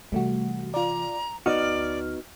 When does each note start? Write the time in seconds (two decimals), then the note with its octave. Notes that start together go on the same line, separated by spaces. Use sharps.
0.12 C3 E3 G3 A3 F#4
0.74 F4 D5 A#5
1.46 D2 B3 D#4 F#4 D5 F6